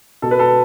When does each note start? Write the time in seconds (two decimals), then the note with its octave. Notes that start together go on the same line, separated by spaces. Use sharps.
0.22 B2 A4
0.31 B4
0.39 A4